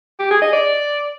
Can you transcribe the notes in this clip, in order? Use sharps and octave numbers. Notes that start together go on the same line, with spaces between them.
G4
G#4
D#5
D5